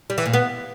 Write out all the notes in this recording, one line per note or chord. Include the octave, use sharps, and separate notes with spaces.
G3
E3
A#2
B3